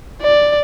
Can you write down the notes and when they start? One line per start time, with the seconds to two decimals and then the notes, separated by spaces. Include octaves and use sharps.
0.23 D5